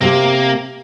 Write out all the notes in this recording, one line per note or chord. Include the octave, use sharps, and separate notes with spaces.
C3 A#3 C4 G4